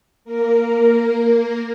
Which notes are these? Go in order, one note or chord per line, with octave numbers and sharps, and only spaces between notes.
A#3 A#4